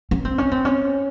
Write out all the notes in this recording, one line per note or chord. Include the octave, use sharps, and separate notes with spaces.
C#4
C4
C#4
C4
C#4